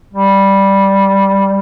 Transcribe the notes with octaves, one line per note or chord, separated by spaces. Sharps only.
G3